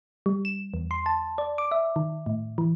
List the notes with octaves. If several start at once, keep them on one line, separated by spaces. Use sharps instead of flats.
G3
E7
E2
C6
A5
D5
D6
E5
D#3
A2
E3